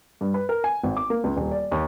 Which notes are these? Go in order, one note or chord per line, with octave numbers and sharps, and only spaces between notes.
G2
B4
A#4
G#5
G#1
D6
A#3
C#2
D#1
D5
D#2